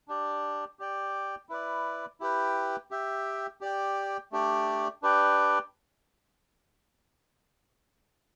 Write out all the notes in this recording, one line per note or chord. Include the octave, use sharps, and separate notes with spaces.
D4 G4 D5
G4 D5 G5
E4 B4 D5
E4 G4 B4 G5
G4 E5 G5
G4 D5 G5
A3 D4 G4 D5
D4 G4 B4 D5 G5